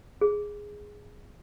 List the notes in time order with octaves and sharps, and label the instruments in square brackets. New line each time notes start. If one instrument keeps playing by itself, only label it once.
[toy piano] G#4